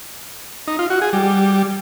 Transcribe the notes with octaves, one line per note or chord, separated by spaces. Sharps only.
D#4
F4
F#4
G#4
G3